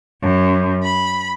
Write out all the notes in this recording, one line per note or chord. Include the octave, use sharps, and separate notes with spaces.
F#2
B5